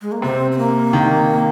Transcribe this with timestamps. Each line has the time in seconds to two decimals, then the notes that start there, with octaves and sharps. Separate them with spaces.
0.02 G#3
0.12 A#3
0.22 C3 C4
0.52 C4
0.58 A#3
0.93 D#3